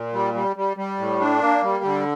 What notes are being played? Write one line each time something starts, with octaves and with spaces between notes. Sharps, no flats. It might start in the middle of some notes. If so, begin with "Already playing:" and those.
Already playing: A#2
G3
G3
G3
G3
A2
D4
A#3
G3
D3